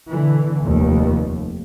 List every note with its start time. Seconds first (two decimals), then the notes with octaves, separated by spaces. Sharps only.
0.11 B2 D3 E3
0.61 F1 D#2